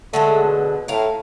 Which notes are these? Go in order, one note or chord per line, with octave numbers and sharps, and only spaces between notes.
D3 F#3 G#3 A3
B2
A2 A#4 F5